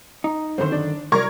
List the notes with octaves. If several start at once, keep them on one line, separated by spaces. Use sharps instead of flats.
D#4
F#2 D3 D#3 C4 C5
D4
C2 F#3 A#4 D5 C#6 G#6